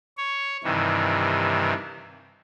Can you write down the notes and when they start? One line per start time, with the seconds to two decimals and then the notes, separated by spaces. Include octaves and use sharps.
0.17 C#5
0.64 G2 C3 D#3 E3